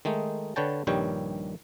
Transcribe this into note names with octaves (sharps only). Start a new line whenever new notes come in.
D#3 G#3 A3 D#4
D3 B4 C#5 G5 A5
A#1 G2 D#3 G3 C#5 G5